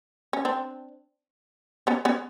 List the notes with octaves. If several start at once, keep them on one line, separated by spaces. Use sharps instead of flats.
C#4
C4 D4
B3 C#4
B3 C#4